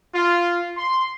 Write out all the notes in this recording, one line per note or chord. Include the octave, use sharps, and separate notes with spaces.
F4
C6